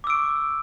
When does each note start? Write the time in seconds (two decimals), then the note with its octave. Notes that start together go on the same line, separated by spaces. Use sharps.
0.04 D6
0.07 E6
0.10 D7
0.13 C#6